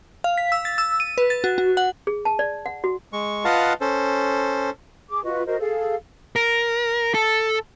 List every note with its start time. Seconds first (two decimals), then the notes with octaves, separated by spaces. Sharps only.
0.24 F5
0.38 B6
0.52 E6
0.65 A6
0.78 E6
1.00 D#7
1.18 B4
1.30 A6
1.44 F#4
1.58 F#4
1.77 F#5
2.07 G#4
2.25 A5
2.39 D5
2.66 F#5
2.84 F#4
3.13 G#3 C#6
3.45 F4 B4 D#5 F5 F#5 A5
3.81 C#4 A4 C5
5.08 G#4 D6
5.24 F4 F#4 B4 D#5
5.46 F#4 A#4 C5 D#5
5.60 G#4 A4 F5
6.36 A#4
7.14 A4